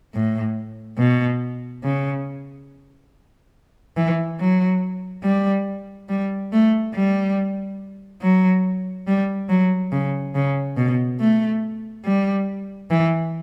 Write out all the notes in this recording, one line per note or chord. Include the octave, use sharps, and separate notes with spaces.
A2
B2
C#3
E3
F#3
G3
G3
A3
G3
F#3
G3
F#3
C#3
C#3
B2
A3
G3
E3